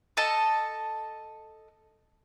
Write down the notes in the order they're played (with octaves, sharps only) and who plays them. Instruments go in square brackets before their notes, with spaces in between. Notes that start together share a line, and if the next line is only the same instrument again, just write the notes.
[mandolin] A4 D#5 A5